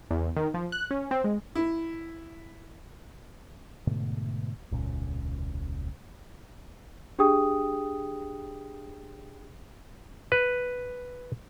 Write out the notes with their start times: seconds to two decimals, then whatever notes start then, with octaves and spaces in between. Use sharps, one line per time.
0.11 E2
0.36 D#3
0.54 F3
0.72 F#6
0.91 C#4
1.11 C4
1.24 G#3
1.55 E4
3.87 G#2 B2 D3 A3
4.71 E1 C#2 A#2 C#4
7.19 D4 G4 G#4 G5 D#6
10.32 B4